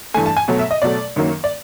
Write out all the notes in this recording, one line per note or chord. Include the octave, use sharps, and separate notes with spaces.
G2 E3 A3 G#5
A5
G#5
B2 F#3 A3
E5
D#5
B2 F#3 A3 D5
F#2 D#3 F#3 A#3
D5